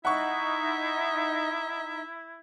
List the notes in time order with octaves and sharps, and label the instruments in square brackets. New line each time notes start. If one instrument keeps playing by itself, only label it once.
[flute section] D#4 [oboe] E4 [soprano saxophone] E5 [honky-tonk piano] F#5 C#6